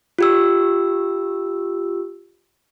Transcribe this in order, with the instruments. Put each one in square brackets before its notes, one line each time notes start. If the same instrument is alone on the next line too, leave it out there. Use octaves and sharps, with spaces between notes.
[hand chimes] F4 G4 E6